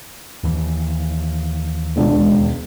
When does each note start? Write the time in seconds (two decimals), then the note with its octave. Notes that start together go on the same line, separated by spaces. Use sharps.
0.43 D#2 E3
1.96 E1 C#2 D4